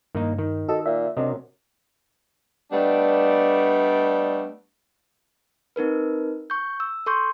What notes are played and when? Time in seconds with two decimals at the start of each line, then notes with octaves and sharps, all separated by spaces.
0.15 G2 D#3 A#3 D#4
0.38 D#3
0.68 F#4 A4 D#5
0.86 A#2 E5
1.17 F#2 C3 D4 D#5
2.72 G3 A3 B3 D4 D5 D#5
5.76 C4 D#4 A#4 B4
6.50 C#6 G6
6.80 E6
7.06 A4 C6 C#6 G6